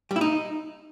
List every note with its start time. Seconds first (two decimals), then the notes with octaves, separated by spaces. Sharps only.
0.11 G3
0.16 E4
0.21 D#4